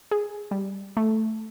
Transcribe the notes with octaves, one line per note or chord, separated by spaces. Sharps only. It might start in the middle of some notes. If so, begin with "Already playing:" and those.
G#4
G3
A3